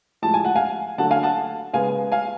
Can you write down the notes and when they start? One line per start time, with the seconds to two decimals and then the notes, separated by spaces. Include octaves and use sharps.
0.22 A2 F3 G#3 A5
0.34 G#5
0.45 F#5
0.56 F5 G#5
0.98 D3 F#3 A3 F#5 A5
1.11 F5 G#5
1.23 F#5 A5
1.73 C#3 G#3 B3 F5 G#5
2.12 F5 G#5